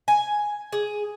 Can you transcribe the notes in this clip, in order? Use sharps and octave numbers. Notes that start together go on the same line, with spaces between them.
G#5
G#4